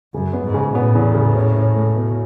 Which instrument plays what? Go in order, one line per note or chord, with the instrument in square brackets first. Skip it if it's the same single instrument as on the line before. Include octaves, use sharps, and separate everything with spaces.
[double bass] F#2 [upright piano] C#3
[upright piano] B3
[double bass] G#2
[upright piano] C#3
[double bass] A2 [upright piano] B3
[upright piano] E2
C#3
C#4
C#4
A3
B2